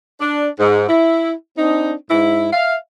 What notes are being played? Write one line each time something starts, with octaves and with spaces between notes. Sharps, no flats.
D4
G#2
E4
C4 D4 D#4
G#2 E4
E5 F5